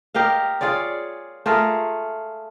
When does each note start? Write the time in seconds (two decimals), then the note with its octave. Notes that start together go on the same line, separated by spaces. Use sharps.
0.15 G4 A#4 D#5 F5
0.61 F4 G#4 C#5 D5
1.46 A3 F4 G#4 A#4